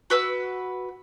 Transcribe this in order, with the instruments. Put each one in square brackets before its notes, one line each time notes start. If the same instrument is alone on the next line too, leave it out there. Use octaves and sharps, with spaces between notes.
[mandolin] F#4 B4 E6